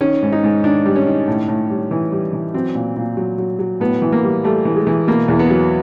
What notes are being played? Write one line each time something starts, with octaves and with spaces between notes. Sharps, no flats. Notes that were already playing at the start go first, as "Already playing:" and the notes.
D#3 C#4
G#2
D#4
G#2
D#3 D4
G3
C#4
D#3
A2
A2
G3
E3
G3
E3
F#3 C4
A#2
A#2
F#3
F#3
F#3
A2 B3
E3
A#3
G3
G3 A3
E3
G#3
E3
B2 A#3
E2
B3
F#3